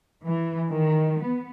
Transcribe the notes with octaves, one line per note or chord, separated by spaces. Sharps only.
E3
D#3
B3